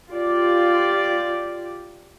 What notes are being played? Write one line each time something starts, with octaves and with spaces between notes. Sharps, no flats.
F4 G4 D5